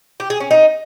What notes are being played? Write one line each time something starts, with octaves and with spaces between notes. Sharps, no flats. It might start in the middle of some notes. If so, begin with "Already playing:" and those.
G4
G#4
C#4
D#4